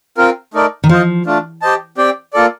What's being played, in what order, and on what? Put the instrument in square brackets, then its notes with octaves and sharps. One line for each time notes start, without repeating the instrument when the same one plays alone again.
[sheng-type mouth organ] C4 F4 A#4
A3 D#4 A#4 D5
[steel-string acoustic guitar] D#3
[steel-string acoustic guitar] F3 [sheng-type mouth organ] F4 C5 D#5
[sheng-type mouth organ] A3 D4 F4
G4 C5 D#5 A5
C4 G4 D5 G5
A#3 F4 A4 D5